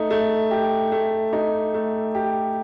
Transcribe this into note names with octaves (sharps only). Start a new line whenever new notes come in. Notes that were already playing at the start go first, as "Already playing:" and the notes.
Already playing: A3 D#4
A3
G4
A3
D#4
A3
G4